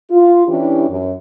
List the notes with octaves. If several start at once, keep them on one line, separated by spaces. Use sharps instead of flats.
F4
E3 C#4 D4 E4 G4
F#2